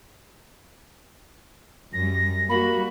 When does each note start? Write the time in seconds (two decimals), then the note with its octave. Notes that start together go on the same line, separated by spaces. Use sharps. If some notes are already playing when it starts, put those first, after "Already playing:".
1.93 F#2 G3 A#6
2.49 G3 A#3 F#4 B5